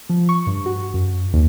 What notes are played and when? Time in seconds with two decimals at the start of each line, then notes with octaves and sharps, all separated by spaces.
0.09 F3
0.29 C#6
0.47 G2
0.66 F#4
0.94 F#2
1.33 D#2